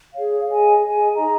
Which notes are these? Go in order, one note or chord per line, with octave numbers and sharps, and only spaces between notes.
G#4 C#5 F5
G#4 D#5 G#5
G#4 D#5 G#5
D#4 G#4 D#5 A#5